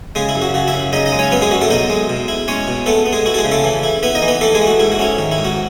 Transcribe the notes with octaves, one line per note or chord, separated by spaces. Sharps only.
C#3 G#3 G#4
E4
F#2
F#4
C#3 F#4
E4 E5
F#2
C#3 D#4 D#5
D#4 D#5
G#3
C#4 C#5
F#2 B3 B4
G#3 G#4
F#2 F#4
A3 A4
B2 D#4 D#5
G#3
B2
E4
G#3 C#4 C#5
B2
A3 B3 A4
B3
G#3 G#4
E4 F#4
A4
G#3 G#4
C#3
A3 A4
E3
E4
B3 E4 B4
D#4 D#5
E3
B3 B4
E3 A3 A4
G#3 G#4
A3
F#4
G#2 E4
F#4
C#4 E4
D#3
E4
G#2
F#4